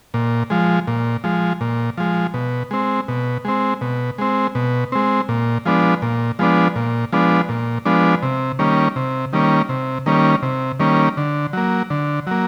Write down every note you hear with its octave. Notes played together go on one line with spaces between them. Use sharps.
A#2
F3 G#3
A#2
F3 G#3
A#2
F3 G#3
B2
G#3 C4
B2
G#3 C4
B2
G#3 C4
B2
G#3 C4
A#2
F3 G#3 B3 D4
A#2
F3 G#3 B3 D4
A#2
F3 G#3 B3 D4
A#2
F3 G#3 B3 D4
C3
D#3 G3 A#3 C#4
C3
D#3 G3 A#3 C#4
C3
D#3 G3 A#3 C#4
C3
D#3 G3 A#3 C#4
D3
F#3 A#3
D3
F#3 A#3